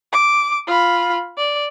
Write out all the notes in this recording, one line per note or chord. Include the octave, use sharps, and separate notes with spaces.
D6
F4 B5
D5